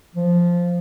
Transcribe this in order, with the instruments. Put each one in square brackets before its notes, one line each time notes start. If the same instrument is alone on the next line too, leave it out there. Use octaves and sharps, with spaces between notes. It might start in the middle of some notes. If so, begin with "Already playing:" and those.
[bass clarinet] F3